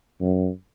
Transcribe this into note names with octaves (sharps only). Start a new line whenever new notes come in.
F#2